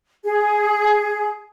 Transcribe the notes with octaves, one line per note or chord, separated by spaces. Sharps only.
G#4